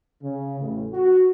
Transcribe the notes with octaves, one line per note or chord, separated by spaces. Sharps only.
C#3
A1
F#4